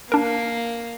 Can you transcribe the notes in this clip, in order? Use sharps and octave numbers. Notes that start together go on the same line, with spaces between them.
A#3 D4 A#4